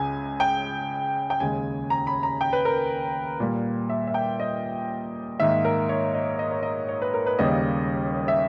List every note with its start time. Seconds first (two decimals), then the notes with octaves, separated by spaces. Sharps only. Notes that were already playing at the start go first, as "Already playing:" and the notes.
Already playing: C#2 C#3 G#3 G#5
0.40 G5
1.30 G5
1.40 D#2 C#3 G#3 G#5
1.90 A#5
2.07 B5
2.23 A#5
2.41 G5
2.53 B4
2.65 A#4
3.40 A#2 G3 A#3
3.89 E5
4.07 E5
4.14 G5
4.40 D#5
5.39 G#2 D#3 A#3 E5
5.65 A#4
5.89 C#5
6.14 D#5
6.39 D#5
6.51 C#5
6.63 D#5
6.89 C#5
7.02 B4
7.14 A#4
7.27 B4
7.39 D#2 C#3 G3 A#3 D#5
8.28 E5